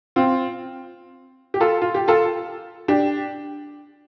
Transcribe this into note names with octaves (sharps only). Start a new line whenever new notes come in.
C4 F4
G4
F4 A4
F4
G4
F4 A4
D4 G4